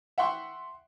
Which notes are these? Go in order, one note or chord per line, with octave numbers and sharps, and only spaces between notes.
E5 F#5 G5 C6 C#6